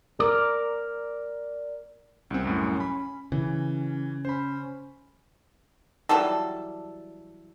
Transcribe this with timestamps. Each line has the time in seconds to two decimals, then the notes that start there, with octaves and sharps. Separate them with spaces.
0.20 A#4 D5
2.31 C2 C4 C#4
2.44 C2 F#2 A2 C#4
2.80 B5
3.32 C#3 E3 C#4
4.25 C#4 C5 B5
6.09 E3 F#3 G3 A4